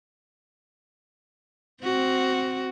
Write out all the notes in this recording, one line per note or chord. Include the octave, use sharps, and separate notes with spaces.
C4 F#4